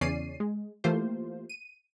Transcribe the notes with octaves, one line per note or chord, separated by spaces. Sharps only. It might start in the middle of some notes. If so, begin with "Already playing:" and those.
E2 C#3 C#4 D5 C7 D#7
G#3
E3 A3 A#3 F4 G4 C5
D#7